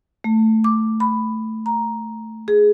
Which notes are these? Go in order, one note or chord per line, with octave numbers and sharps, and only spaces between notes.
A3
D6
B5
A#5
G#4